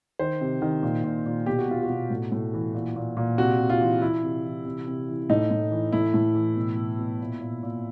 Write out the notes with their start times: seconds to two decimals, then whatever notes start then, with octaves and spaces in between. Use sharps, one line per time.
0.19 D#3 C5
0.41 C3
0.62 D#3
0.83 A#2
1.04 A#2
1.26 A#2
1.46 B2 G4
1.59 F#4
1.68 B2 F4
1.83 F#4
1.90 B2
2.10 A2
2.32 A2
2.54 E3
2.74 A#2
2.96 A#2
3.17 A#2
3.38 C3 F#4
3.59 C3
3.70 F4
3.80 E3
4.02 E3 E4
4.23 C3
4.45 E3
4.65 C3
4.87 C3
5.09 E3
5.30 A2 D#4
5.51 A2
5.71 E3
5.92 A2 E4
6.14 A2
6.35 E3
6.56 B2
6.77 B2
6.99 B2
7.20 A#2
7.41 A#2
7.63 A#2